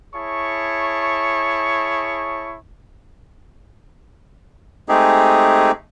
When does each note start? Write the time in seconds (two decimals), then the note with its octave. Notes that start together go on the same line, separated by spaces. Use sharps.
0.14 E4 G#4 C#5 A5 C#6
4.89 G#3 A3 C4 D#4 G4 G#4